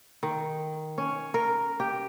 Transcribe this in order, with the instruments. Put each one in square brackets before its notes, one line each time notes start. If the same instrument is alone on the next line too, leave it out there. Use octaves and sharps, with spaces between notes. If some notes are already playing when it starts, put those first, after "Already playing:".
[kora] D#3
C#4
A#4
G4